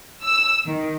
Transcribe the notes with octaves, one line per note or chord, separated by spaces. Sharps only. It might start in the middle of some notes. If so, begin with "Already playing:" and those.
E6
D#3